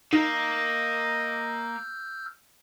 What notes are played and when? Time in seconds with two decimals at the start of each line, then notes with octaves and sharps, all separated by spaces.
0.13 A#3 D#4 D#5 F5 E6 F6 G6